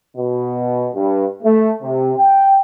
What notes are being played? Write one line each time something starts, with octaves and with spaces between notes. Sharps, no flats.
B2
G2
A3
C3
G5